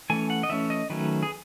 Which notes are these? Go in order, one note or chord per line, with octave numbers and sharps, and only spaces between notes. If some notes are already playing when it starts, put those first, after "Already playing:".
E3 A3 C#4 G#5
F#5
D#5
E3 A3 C#4 E5
D#5
D#3 F#3 A3 C#4 B4
G#4